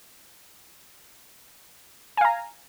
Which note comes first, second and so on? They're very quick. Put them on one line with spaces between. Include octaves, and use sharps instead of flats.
G#5 F5 A#5